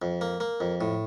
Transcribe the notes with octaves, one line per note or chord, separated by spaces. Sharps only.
F2
A#3
A#3
F2
A2